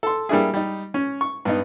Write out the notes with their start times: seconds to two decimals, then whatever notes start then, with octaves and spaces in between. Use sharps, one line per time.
0.03 A4 C6
0.29 G3 A#3 D4 E4 G#4
0.54 G3 D#4
0.94 C#4
1.21 C#6
1.45 G2 B3 D#4